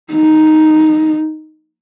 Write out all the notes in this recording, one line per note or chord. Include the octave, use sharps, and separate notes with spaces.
D#4